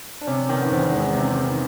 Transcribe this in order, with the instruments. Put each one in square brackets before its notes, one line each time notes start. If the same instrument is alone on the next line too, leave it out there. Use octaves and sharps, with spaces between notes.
[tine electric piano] D4
[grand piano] C3 [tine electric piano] C#4
[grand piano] D#3 [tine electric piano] B3
[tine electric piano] B3
[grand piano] E2 [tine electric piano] C4
[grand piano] G#3
C3
D#3